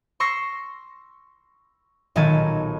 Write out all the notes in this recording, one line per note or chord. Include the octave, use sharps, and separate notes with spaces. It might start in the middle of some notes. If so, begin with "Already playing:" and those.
C6 C#6 E6 A#6 C7
B1 A#2 D#3 G#3 A4 G#5